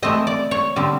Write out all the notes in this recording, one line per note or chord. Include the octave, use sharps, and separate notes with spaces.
E3 A3 C4 D#5
D5
C#5
D3 G3 C4